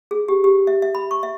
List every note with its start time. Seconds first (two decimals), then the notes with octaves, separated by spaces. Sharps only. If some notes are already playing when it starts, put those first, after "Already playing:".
0.11 G#4
0.28 G4
0.44 G4
0.67 E5
0.82 E5
0.95 B5
1.11 C#6
1.23 E5